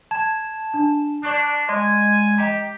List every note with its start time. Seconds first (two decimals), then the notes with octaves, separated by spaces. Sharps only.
0.11 A5 G#6
0.74 D4
1.23 D4 D5 C#6 F#6
1.69 G#3 G#5
2.38 G4 D#5 G5 A#5